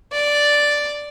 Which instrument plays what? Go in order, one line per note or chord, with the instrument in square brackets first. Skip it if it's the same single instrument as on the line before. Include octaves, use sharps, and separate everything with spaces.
[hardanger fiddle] D5